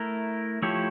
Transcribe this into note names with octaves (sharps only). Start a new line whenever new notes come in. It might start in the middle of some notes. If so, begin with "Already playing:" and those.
Already playing: A3 E4 A#4
F3 A3 E4 G4 C#5